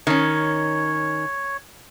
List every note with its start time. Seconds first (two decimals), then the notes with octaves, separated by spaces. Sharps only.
0.07 D#3 C#4 C#5